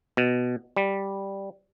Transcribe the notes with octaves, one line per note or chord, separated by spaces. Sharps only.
B2
G3